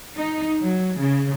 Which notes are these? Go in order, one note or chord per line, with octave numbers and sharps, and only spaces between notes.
D#4
F#3
C#3